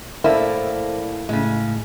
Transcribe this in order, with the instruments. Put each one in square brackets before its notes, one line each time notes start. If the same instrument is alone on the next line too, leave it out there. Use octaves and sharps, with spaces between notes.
[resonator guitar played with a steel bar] A2 A#3 E4 [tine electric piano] A4 C5 D5
[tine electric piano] A2 A3 [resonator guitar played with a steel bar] C#3 G#3